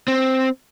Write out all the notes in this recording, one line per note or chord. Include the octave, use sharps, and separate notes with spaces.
C4